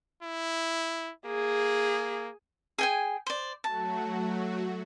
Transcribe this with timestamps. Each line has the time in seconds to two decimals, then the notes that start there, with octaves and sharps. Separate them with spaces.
0.23 E4
1.26 A#3 G#4
2.78 G#4 G5 G#5
3.27 C5 D5
3.64 F#3 A3 F#4 A5